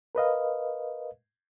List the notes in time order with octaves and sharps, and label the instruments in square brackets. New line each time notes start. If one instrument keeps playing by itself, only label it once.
[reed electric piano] A#4 B4 D#5 F5